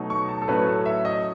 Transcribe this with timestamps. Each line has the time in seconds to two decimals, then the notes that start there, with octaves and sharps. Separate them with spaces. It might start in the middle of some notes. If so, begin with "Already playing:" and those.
Already playing: B2 F#3 A3 D#4
0.10 C#6
0.29 A5
0.42 A4
0.48 A2 F#3 A3 C#4 B4
0.67 A4
0.86 E5
1.05 D#5